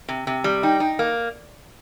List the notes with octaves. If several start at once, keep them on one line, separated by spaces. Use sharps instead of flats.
C3
C3
G3
D#4 G5
D#4
A#3